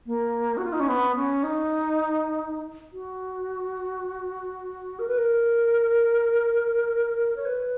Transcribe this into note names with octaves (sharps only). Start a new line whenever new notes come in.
A#3
F#4
F4
D#4
C#4
B3
C#4
D#4
F#4
A#4
B4
A#4
C#5
B4